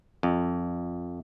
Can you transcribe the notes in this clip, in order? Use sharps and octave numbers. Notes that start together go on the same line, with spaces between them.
F2